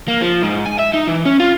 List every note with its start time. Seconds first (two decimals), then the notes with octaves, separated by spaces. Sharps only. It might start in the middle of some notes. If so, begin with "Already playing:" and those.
0.08 A#3
0.22 F3
0.43 G#2
0.66 G#5
0.79 E5
0.94 D#4
1.08 E3
1.26 C#4
1.39 F4